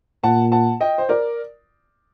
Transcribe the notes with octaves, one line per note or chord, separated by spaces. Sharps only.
A#2 F#5 A5
F#5 A5
D#5 G5
C5
A#4 D5